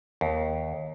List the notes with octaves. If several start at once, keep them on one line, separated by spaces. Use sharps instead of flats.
D#2